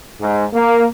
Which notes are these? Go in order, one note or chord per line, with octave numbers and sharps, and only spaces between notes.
G#2
A#3